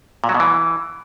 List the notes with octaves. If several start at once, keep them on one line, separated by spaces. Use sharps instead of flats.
A#2
F#3
B2
E3